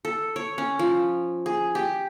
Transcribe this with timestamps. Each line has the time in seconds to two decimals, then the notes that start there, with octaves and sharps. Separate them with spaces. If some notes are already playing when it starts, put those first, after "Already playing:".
0.05 A4
0.36 C#5
0.58 C#4
0.79 F3
1.46 G#4
1.75 G4